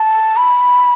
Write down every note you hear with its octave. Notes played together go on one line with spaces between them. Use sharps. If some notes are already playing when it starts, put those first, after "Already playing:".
Already playing: A5
B5